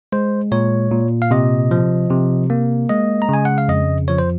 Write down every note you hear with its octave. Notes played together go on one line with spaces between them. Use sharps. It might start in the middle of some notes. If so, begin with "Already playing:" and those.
G#3 C5
A#2 C#5
A#2
F5
C3 D#5
F3
C3
A#3
G#3 D#5
A#5
C#3 G#5
F#5
F5
F2 D#5
F3 C#5
C5